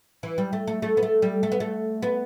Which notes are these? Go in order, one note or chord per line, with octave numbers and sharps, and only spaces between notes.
E3
G3
A3
A3
A3
B3
A3
G3
A3
B3
A3
B3